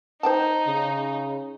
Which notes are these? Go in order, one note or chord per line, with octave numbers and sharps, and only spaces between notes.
D#4 C5 G5 A5
C#3